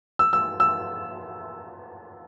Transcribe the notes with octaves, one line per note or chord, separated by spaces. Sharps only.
E6
E6
E6